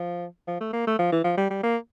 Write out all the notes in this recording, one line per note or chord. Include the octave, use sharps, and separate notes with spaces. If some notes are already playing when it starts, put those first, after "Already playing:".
Already playing: F3
F3
A3
A#3
A3
F3
E3
F3
G3
G3
A#3